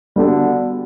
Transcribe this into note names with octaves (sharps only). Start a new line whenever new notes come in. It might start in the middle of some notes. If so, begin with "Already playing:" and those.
D3 G3 B3 D4 F#4